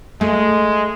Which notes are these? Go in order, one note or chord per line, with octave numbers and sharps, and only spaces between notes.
G#3 A3